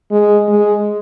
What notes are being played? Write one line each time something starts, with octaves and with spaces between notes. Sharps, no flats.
G#3
G#3